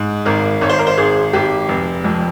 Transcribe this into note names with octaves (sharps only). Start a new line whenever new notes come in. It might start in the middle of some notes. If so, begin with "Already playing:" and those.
Already playing: G#2
G#1 A#4
G#1 C#5
C5
A#4
C5
G#1 G#4
G#1 G4
F1
F2